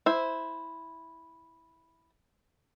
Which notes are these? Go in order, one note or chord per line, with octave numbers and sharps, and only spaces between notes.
E4 C5